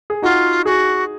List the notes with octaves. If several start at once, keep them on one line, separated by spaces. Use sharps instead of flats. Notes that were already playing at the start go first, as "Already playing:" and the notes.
G#4
D#4 F4 F#4
F#4 G#4